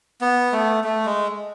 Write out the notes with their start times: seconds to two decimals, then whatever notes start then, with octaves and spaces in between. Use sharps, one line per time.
0.21 B3
0.52 A3
0.84 A3
1.06 G#3